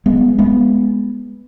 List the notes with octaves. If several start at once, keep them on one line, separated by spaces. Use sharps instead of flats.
G#3 B3
G#3 B3